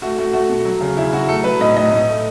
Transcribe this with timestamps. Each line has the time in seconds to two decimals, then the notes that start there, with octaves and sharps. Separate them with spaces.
0.02 A3 F#4
0.17 A3 F#4
0.33 A3 F#4
0.50 B2
0.65 F#3
0.81 C#3
0.97 C#3 E4
1.13 F#3 F#4
1.29 A3 A4
1.44 F#3 B4
1.61 A2 D#5
1.76 A2 D#5
1.91 A2
2.08 A3